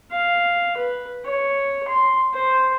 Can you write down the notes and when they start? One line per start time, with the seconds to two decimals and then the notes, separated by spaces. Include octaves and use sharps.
0.11 F5
0.77 B4
1.25 C#5
1.88 C6
2.34 C5